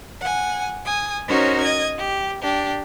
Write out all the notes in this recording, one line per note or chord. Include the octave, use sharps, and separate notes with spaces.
F#5 G#5
G#5 D#6
C#4 D#4 F#4 A#4 C5 C#5
D#5 G#6
G4
D4 G4